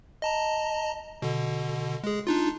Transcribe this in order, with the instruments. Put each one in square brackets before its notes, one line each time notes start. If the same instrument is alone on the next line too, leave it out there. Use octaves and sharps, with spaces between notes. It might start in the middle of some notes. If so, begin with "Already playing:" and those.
[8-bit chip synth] D#5 A5 A#5
B2 D3
G#3 G#4
D4 D#4 F4